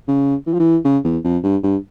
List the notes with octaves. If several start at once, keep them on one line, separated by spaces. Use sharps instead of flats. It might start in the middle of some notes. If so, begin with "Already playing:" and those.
C#3
E3
F3
E3
C#3
E2
F2
G2
G2